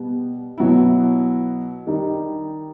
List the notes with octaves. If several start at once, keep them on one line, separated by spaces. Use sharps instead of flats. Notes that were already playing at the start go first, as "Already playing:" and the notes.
Already playing: B2 G3 B3
B2 F#3 B3 E4
D#3 G3 D#4